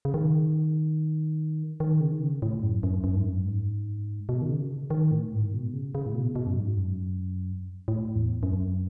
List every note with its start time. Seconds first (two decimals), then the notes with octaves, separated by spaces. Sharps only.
0.05 C#3
0.14 D#3
1.80 D#3
2.00 C#3
2.12 D#3
2.21 C#3
2.42 A2
2.63 F#2
2.83 F#2
3.04 F#2
3.16 G#2
3.26 F#2
3.45 G#2
4.29 B2
4.42 D#3
4.49 C#3
4.90 D#3
5.11 A2
5.33 G#2
5.53 B2
5.73 C#3
5.95 C#3
6.06 A2
6.15 B2
6.36 B2
6.47 F#2
6.57 G#2
6.78 F#2
7.88 A2
8.16 E2
8.43 F#2